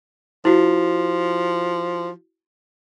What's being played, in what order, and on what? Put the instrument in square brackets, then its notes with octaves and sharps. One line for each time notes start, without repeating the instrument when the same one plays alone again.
[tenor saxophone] F3 [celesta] E4 F#4